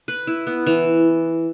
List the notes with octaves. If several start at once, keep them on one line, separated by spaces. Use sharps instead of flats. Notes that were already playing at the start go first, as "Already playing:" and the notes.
B4
E4
B3
E3